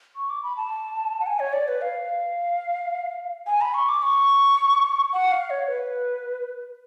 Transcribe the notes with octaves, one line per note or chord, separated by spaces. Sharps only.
C#6
D6
B5
A5
F#5
G#5
C#5
D5
B4
F5
G#5
B5
C#6
D6
C#6
F#5
F5
C#5
B4